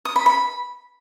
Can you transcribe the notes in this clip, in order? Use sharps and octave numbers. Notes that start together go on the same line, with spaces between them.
D#6
B5
B5